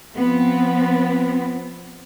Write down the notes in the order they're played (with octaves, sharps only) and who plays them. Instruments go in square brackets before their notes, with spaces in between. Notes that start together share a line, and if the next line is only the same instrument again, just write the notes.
[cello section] F3 B3 C4